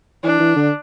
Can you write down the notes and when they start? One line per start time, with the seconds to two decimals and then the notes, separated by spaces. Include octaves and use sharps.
0.24 E3 D4
0.40 E3
0.56 D3